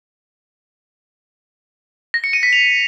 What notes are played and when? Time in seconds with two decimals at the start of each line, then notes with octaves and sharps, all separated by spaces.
2.14 A#6
2.24 C#7
2.33 D#7
2.43 B6
2.53 F7